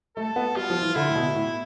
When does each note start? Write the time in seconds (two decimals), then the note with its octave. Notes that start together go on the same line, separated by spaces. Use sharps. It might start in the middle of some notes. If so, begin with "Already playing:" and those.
0.17 A3 A4
0.36 B3
0.56 G3 F4
0.70 F3
0.82 E3
0.95 D3 E4
1.07 A2
1.15 B2
1.35 A2